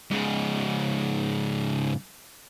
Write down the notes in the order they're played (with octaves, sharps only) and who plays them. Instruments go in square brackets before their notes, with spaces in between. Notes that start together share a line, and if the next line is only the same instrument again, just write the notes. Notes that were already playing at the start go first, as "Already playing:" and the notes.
[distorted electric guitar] G#2 C#3